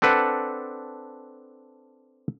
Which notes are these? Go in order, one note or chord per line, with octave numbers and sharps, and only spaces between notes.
C4 D4 A4 B4 F#5